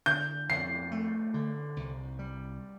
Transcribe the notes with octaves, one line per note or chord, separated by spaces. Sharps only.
D3 G6
F2 C7
A3
D3
C2
G3